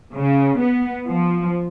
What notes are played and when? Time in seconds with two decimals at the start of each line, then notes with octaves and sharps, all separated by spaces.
0.15 C#3
0.60 B3
1.10 F3